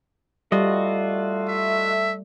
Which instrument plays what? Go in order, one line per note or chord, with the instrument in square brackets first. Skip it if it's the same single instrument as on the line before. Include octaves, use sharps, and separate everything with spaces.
[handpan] G3 [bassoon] A3 [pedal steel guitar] F4 F#4 D#5
[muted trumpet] E5